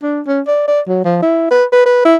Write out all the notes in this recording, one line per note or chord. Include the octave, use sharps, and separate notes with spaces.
D4
C#4
D5
D5
F#3
F3
E4
B4
B4
B4
E4